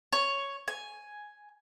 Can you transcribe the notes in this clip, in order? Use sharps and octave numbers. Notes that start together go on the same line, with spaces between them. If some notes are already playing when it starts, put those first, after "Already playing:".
C#5
G#5